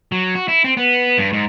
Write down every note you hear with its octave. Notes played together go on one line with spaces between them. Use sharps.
F#3
F#4
E4
C4
B3
G2
G#2